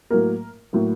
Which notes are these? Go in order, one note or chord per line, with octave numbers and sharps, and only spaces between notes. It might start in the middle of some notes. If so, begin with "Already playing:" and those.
A2 F#3 A#3 A#4
A2 F#3 A#3